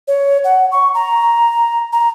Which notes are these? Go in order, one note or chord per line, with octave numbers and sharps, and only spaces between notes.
C#5
F#5
C#6
A#5
A#5